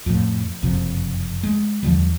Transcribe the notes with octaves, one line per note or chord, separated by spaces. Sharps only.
F2 A2
F#1 F2 C3
G#3
E2 D3 F3 G3